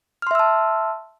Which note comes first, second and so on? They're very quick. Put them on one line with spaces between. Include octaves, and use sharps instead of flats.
F6 C6 E5 E6 A5